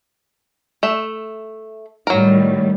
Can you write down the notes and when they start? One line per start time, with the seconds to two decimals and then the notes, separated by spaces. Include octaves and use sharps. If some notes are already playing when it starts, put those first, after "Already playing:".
0.83 A3 E5
2.07 A2 D#3 F#3 G3 A#4